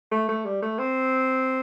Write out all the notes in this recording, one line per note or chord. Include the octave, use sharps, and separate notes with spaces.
A3
A3
G3
A3
C4